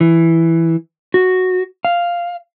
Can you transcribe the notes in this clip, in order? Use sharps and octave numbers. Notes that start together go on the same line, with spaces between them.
E3
F#4
F5